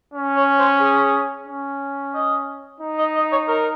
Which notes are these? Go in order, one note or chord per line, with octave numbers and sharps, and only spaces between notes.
C#4
C#5
C5
G#4
C#4
D#5
D#4
D#5
D#5
C#5
A#4